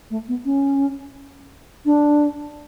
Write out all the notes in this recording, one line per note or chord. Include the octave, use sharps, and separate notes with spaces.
A3
B3
C#4
D4